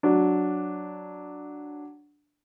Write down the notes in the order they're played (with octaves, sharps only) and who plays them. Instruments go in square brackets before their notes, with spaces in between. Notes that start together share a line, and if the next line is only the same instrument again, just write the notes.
[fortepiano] F#3 D4